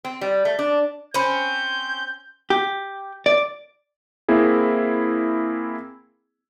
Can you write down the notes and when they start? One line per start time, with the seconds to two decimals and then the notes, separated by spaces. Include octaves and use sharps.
0.04 C4
0.21 G3
0.45 A3
0.59 D4
1.14 C4 C#4 C5 B5 G6
2.50 G4
3.26 D5
4.28 A#3 C4 E4 G#4